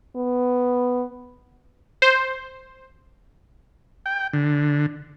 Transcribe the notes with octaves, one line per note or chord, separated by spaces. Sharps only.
B3
C5
G5
D3